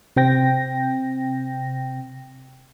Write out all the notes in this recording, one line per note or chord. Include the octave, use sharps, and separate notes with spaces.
C3 C4 G5 A#6